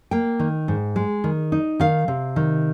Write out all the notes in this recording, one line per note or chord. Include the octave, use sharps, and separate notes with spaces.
A#3 G5
D#3
G#2
G#3
D#3
D#4
D#3 F5
C3
D#3